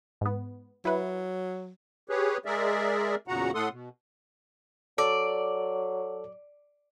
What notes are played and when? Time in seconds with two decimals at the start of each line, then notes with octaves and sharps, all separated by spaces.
0.21 G#2 B3
0.85 F#3 E4 B4
2.09 G4 G#4 B4 C#5
2.45 G#3 G#4 A#4 D5 E5
3.28 E2 A#2 C#3 F#4 F#5 A#5
3.55 A2 A3 A4 F#5 C6 D#6
3.71 B2
4.98 F#3 A4 D5